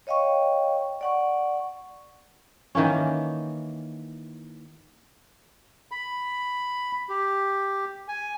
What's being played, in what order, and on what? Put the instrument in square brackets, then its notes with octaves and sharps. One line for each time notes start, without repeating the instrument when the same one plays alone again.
[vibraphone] C#5 D#5 F5 G5 C#6
D5 F#5 C#6
[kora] D#3 E3 A#3 C#4
[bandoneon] B5
G4
G#5